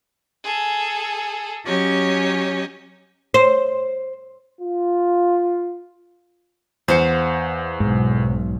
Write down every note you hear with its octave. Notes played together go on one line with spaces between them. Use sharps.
G#4 A4
F#3 C#4 G4 C#5 D#5
C5
F4
E2 C5 F5 F#5 C#7
B1 G#2